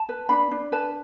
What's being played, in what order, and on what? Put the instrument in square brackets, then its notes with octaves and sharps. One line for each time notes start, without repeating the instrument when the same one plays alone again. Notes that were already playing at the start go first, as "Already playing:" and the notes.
Already playing: [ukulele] A5
B4
D4 B5
D4
B4 A5